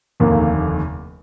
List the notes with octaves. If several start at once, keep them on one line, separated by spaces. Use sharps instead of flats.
F1 D#2 D3 A#3